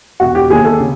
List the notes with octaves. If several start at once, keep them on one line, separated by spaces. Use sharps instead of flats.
E1 F#4
G4
D#2 G#4
A4
C#3